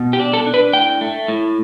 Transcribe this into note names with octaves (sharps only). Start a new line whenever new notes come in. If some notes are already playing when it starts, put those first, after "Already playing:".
Already playing: B2
G4
D4
A4
D4
B4
A2 G5
A3
A2